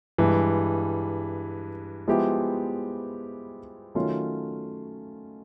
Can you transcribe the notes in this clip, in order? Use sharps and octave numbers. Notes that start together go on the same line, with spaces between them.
G2 E3 G#3
F3 G#3 B3 E4 G4
D#3 F#3 A3 C#4 F4